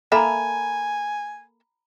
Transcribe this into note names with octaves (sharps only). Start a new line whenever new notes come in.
A#3 A4 E5 G#5 A#5 B5